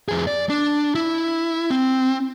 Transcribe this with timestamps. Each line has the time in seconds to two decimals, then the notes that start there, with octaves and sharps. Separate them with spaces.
0.09 F2 G#4
0.27 D5
0.49 D4
0.95 E4
1.70 C4